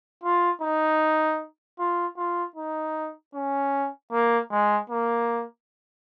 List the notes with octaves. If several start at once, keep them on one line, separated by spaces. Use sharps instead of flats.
F4
D#4
F4
F4
D#4
C#4
A#3
G#3
A#3